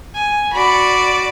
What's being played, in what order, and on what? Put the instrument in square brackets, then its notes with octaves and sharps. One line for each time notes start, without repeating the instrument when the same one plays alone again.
[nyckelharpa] G#5
[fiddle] F#4 D5 [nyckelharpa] B5